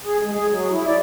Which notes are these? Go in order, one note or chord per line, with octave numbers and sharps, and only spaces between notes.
G#4
G#3
G#4
F#3
E4
D5